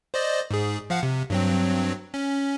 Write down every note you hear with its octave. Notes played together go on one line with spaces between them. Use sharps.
C5 D5 D#5
G#2 G#4
F3 F5 F#5
C3
G2 F#3 C4
C#4